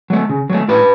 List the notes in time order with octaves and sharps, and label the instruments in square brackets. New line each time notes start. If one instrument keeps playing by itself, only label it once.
[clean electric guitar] F#3 A3
C#3
F#3 A3
A2 G4 B4